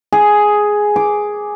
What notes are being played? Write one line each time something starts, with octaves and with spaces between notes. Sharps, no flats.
G#4
D6